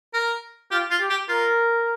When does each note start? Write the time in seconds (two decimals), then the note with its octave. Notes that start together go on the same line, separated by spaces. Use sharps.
0.14 A#4
0.71 F4 G4
0.91 F4
1.00 G4
1.10 G4
1.29 F4 A#4